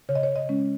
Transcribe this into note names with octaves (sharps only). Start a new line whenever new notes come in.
C#3 C#5
D#5
C#5
D#5
G#3 C#4